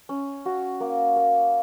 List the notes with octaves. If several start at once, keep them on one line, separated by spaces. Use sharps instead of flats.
C#4
F#4
A#3
A#3